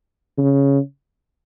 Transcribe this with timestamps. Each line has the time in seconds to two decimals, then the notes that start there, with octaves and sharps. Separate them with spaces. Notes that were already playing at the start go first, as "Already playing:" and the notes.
0.38 C#3